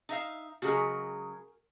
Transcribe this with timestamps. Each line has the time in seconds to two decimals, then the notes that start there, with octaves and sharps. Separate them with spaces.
0.09 D#4 E5 F5
0.62 C#3 F#3 G#3 F#4 G#4 A#4